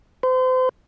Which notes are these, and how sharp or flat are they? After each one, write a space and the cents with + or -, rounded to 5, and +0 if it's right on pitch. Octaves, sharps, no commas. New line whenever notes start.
C5 -35